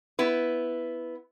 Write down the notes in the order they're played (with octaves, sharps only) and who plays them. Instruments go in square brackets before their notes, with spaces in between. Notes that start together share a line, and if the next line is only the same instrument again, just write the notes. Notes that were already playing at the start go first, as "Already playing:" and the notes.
[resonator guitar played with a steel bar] B3 E4 B4